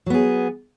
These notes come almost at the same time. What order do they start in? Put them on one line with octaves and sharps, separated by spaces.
F#3 B3 G#4